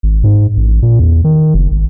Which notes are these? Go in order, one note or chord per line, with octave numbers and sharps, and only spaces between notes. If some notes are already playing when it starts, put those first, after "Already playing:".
G#1
G#2
A1
A#2
E2
D#3
F#1
G#1